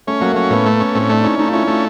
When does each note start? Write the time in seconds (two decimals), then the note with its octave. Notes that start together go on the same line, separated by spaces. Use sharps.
0.07 A3 C#4
0.20 F#3 A#3
0.33 A3 C#4
0.50 A2 B3
0.66 A3
0.80 C#4
0.95 A2 C4
1.09 A3 D4
1.19 E4
1.24 C#4 D#4
1.38 A3 D#4
1.49 F4
1.53 C#4 E4
1.67 A3 F4